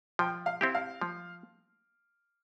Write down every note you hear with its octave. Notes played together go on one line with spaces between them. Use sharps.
F3 G5
F5
C4 E4 G4
F5
F3